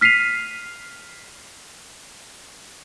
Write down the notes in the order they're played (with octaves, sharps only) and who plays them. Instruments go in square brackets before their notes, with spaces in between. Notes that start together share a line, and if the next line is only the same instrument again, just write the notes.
[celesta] F6 B6 C7 D#7 F7